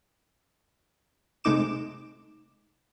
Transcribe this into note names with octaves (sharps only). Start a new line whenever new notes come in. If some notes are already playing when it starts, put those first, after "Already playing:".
C3 G#3 A3 D#4 D6 E7